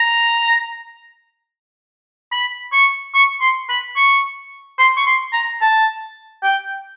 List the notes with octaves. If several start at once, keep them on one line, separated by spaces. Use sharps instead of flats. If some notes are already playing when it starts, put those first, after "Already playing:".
Already playing: A#5
B5
C#6
C#6
C6
B5
C#6
C6
C#6
C6
A#5
A5
G5